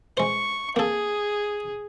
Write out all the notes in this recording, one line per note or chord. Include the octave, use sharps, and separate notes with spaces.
G#3 C5 C#6
A#3 G#4 A4